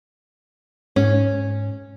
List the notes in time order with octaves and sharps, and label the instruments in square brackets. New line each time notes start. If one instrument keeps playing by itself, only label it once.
[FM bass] G#2 [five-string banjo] C#4